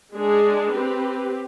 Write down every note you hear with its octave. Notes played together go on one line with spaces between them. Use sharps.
G#3 D4 G#4
C4 G4 B4